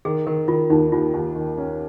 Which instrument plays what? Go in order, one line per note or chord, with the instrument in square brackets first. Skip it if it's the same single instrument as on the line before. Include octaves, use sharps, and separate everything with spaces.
[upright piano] D#3 [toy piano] G#4
[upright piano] D#3 [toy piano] A#4
[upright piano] D#3 [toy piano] F4
[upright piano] D#2 [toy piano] D#4
[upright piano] D#2 [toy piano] F4
[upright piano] D#2
D#3
C#4